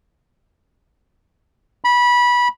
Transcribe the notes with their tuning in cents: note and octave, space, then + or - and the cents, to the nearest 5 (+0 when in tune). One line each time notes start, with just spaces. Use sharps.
B5 -20